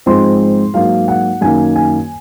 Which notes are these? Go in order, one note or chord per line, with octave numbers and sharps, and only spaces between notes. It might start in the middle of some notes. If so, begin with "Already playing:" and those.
G#2 F3 G#3 C4 C6
G#2 F#3 A#3 F5
F#5
F#2 D#3 A#3 G#5
G#5